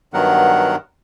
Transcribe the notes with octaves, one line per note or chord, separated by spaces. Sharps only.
G2 D#3 F#3 B3 A#4 F#5